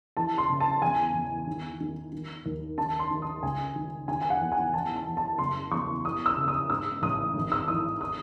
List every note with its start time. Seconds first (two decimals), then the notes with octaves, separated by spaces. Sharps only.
0.17 E3 A5
0.38 C6
0.50 C#3
0.60 A5
0.82 E2 G#5
1.14 E2
1.47 D#3
1.80 D#3
2.12 D#3
2.46 D#2
2.78 D#3 A5
2.99 C6
3.11 D#3
3.22 D#6
3.43 C#2 G#5
3.76 D#3
4.08 D#3 G#5
4.22 G#5
4.30 F#5
4.41 E2
4.52 G#5
4.73 E3 A5
4.96 A5
5.07 E3
5.17 A5
5.38 F#1 C6
5.71 E2 C#6
6.05 E3 D#6
6.26 E6
6.37 C#3
6.48 D#6
6.70 G#2 E6
7.02 A1 D#6
7.34 G#1
7.52 E6
7.68 E3 D#6
8.01 D#6